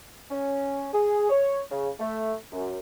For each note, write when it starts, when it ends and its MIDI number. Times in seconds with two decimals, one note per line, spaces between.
0.31 0.88 61
0.93 1.29 68
1.30 1.61 73
1.71 1.89 49
2.00 2.34 57
2.52 2.77 42